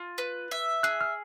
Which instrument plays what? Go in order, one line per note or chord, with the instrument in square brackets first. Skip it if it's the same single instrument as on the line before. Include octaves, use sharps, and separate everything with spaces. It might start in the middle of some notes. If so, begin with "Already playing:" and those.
Already playing: [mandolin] F4
B4
E5
[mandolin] G#4 [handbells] F#6
[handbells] F6